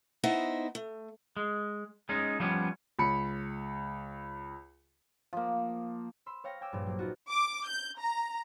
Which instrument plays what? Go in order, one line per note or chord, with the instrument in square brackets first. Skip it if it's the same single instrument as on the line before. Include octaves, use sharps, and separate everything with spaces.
[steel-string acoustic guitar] B3 D#4 E4 C5 D#5 E5
A3
[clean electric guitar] G#3
G#3 C#4 D#4
F3 G3 B3 C#4
[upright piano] C#2 B5 C#7
[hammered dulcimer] F3 A#3
[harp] B5 C6 E6
C#5 F5 G5 C#6 A#6
G5 G#5 D6 E6
A#1 G2
F#3 A#3
A#3 B3 D#4 F4 F#4
[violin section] D6
G6
A#5